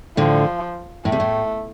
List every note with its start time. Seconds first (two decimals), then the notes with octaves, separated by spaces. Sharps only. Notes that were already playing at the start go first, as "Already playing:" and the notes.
0.17 A2 D3 F3
1.05 A2 A3
1.12 C3
1.20 A2